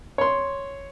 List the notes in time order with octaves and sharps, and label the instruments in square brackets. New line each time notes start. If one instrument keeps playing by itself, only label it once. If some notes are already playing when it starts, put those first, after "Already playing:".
[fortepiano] C#5 C6